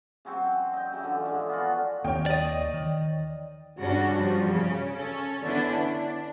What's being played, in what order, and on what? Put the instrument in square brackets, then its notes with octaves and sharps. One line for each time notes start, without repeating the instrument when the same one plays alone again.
[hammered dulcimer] C#3 F#3 C4
D#5 G5
C#3 F#3 E5
D3 E3 F3
D3 G#3
B3 F4 F#4
[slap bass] D#2 D#3 A#3 [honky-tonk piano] C#5 G5
[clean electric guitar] D5 D#5
[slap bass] D#3
[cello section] G2 C#3 C#4 D4 F#4
F3 G3
C#3 C#4
C#4 A4
D3 B3 C#4 D4 E4
D4